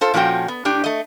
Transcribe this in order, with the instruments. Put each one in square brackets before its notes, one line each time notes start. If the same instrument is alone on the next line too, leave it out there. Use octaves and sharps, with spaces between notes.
[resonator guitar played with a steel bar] F4 A4 C5
A#2 F3 C#4 F#4 G5
B3
A2 D4 G4
A3 D#5